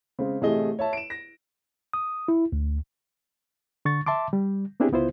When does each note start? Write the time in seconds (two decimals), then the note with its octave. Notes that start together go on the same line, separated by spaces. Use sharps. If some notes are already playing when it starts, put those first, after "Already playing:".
0.19 C#3 G#3 C4
0.41 A1 C3 A3 G#4 D#5 G7
0.79 C#5 E5 A5
0.93 D7 E7
1.10 A#6
1.93 D#6
2.28 E4
2.52 D2
3.85 D3 C#6 A6
4.06 E5 A5 C6 D6
4.33 G3
4.80 B3 C4 D4 E4 G4 G#4
4.92 C#2 B3 E4 F4 C5